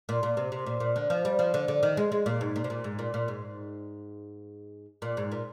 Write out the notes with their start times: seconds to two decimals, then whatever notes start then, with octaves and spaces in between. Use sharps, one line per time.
0.09 A#2
0.23 A#2
0.37 C3
0.52 C3
0.66 A#2
0.80 A#2
0.96 D3
1.10 F3
1.25 G3
1.39 F3
1.54 D3
1.68 D3
1.83 D#3
1.97 G#3
2.12 G#3
2.26 A#2
2.41 G#2
2.56 A#2
2.64 C3
2.70 A#2
2.84 G#2
2.99 A#2
3.14 A#2
3.28 G#2
5.02 A#2
5.17 G#2
5.32 A#2